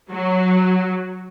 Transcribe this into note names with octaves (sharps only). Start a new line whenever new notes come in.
F#3